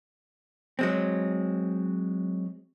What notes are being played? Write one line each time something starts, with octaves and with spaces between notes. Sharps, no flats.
F#3 G#3 C4